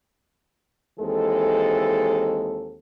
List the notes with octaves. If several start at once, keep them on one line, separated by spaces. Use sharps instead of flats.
D#2 E3 G#3 C4 A4